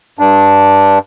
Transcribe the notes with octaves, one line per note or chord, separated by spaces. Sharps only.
G2 D4